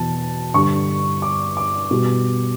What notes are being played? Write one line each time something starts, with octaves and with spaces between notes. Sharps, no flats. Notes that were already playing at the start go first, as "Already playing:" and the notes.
Already playing: E2 B2 A5
G2 D3 G3 C#6
D6
D6
B2 G3